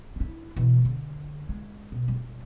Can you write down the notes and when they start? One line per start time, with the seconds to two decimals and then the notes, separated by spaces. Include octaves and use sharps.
0.16 D4 E4
0.57 B2 E3
0.85 D3
1.49 G#3
1.92 B2
2.08 G3